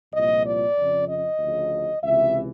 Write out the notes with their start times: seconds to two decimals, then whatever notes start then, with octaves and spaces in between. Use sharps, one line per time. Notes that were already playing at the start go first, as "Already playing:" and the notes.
0.12 C2 A#2 F3 D#5
0.44 D5
0.76 F2 C#3 F3
1.07 D#5
1.39 D2 C#3 F3
2.02 C#2 C3 E3 E5